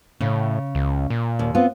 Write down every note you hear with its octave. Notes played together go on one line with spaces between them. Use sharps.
A2 C#3
C#2
A#2
D#2
B3 C4 F4